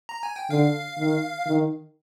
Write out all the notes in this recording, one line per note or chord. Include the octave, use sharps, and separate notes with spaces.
A#5
G#5
G5
D3 F5
D#3
D#3